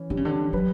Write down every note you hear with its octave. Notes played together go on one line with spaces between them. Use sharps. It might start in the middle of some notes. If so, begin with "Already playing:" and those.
Already playing: E3 C#4
D3 G3
C#3
D3
F#3 B4